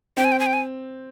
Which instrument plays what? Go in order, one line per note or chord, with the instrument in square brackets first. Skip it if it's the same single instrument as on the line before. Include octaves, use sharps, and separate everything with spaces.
[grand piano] C4 [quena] G5
[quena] G#5
G5
G#5
G5
G#5